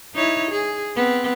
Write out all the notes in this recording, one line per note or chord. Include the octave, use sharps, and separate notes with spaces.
D#4 E4 C#5
G#4
B3 C4